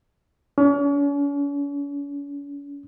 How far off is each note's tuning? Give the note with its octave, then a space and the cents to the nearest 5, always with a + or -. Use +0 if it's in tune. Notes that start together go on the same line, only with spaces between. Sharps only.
C#4 +45